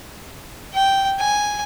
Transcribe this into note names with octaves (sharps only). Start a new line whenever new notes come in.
G5
G#5